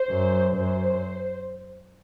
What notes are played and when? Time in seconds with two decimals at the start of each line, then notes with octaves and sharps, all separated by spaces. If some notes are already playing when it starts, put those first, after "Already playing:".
Already playing: C5
0.10 F#2
0.56 F#2 C5